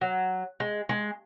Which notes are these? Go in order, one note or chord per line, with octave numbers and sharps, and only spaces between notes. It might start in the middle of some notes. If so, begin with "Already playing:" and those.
F#3
G#3
G#3